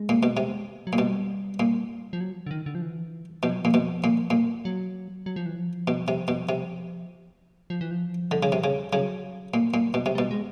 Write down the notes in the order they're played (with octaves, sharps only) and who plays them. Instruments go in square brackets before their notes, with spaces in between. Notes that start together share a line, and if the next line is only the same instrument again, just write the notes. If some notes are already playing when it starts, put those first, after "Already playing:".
Already playing: [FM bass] G#3
[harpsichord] A#2
B2
C3
[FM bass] F#3
[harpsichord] A#2
[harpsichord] B2 [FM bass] G3
[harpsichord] A#2
[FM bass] F3
F#3
D3
D#3
D3
F3
E3
[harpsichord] B2 [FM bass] F3
[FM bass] F#3
[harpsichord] A#2 [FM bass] F3
[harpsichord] B2
A#2
A#2
[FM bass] F#3
F#3
F3
E3
F3
[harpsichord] B2
C3
B2
C3
[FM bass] F3
E3
F3
[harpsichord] D3
C#3
C3
C#3
[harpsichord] C#3 [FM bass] F#3
[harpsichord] A#2
A#2
B2
C3
[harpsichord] B2 [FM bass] G3
[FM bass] G#3